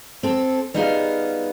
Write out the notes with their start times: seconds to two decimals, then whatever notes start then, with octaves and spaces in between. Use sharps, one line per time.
0.23 C4 A4
0.74 G3 B3 D#4 F4 G#4 F5